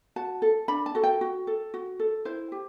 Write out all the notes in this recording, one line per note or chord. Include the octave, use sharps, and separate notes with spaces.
F#4 A5
A4
D4 B5
A5
F#4 A4
G5
F#4
A4
F#4
A4
E4 C5
G4